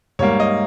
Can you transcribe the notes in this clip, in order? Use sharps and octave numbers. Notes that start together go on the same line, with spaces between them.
G#2 G3 A#3 C#5
D#5